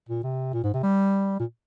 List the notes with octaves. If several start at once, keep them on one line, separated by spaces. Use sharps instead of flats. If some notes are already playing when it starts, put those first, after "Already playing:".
A#2
C3
A#2
G#2
C3
G3
A#2